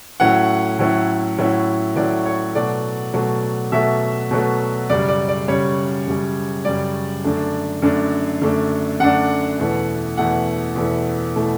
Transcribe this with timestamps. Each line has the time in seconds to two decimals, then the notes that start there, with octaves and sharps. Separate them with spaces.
0.20 A2 F#3 C#4 E4 F#5
0.79 A2 F#3 C#4 E4
1.38 A2 F#3 C#4 E4
1.96 A2 F#3 C#4 E4 D5
2.26 C#5
2.55 B2 F#3 A3 D5
3.13 B2 F#3 A3
3.72 B2 F#3 A3 E5
4.31 B2 F#3 A3
4.90 F#2 C#3 G3 D5
5.08 D5
5.28 D5
5.48 F#2 C#3 G3 C#5
6.07 F#2 C#3 G3
6.65 F#2 C#3 G3 D5
7.24 F#2 D3 A3 D4
7.82 F#2 D3 A3 D4
8.41 F#2 D3 A3 D4
9.00 F#2 D3 A3 D4 F#5
9.59 E2 B2 A3 E4
10.17 E2 B2 A3 E4 F#5
10.76 E2 B2 A3 E4
11.36 B2 A3 E4